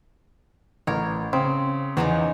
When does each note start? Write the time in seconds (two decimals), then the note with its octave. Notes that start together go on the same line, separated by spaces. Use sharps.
0.87 A1 A#4 C#5
1.33 C#3 C4
1.97 E2 C#3 F3 D#4